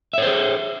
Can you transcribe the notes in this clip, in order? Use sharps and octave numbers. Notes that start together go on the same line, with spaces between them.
G#4 C5 C#5 E5